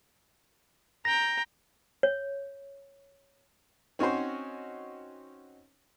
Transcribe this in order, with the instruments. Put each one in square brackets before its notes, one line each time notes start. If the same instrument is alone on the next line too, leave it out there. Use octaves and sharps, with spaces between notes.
[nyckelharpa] G5 A#5 [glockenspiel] A#6
[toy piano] C#5
[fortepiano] C4 C#4 D#4 F#4 C5